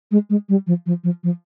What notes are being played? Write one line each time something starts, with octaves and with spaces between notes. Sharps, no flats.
G#3
G#3
G3
F3
F3
F3
F3